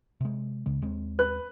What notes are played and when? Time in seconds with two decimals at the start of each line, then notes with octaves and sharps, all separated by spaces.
0.21 C3 G#3
0.66 C#2 C#3 G#3
0.82 D#2 G#3 C4
1.19 B4 F#6